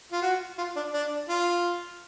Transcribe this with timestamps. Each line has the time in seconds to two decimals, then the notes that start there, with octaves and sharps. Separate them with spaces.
0.12 F4
0.22 F#4
0.58 F4
0.76 D4
0.93 D4
1.29 F4